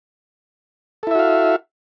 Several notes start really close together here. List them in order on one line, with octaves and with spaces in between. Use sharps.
A4 E4 E5 F#4 F5